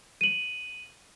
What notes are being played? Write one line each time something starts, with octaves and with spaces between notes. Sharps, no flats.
D#7 F#7